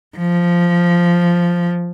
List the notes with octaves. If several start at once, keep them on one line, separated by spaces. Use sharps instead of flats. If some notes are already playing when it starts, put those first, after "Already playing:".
F3